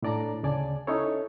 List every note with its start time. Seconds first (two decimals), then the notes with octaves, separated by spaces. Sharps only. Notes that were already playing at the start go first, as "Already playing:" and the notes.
0.03 A2 D4 D5 A5 A#5
0.43 D2 C#3 D5 G#5 A5
0.87 C#4 D#4 E4 A4 C#5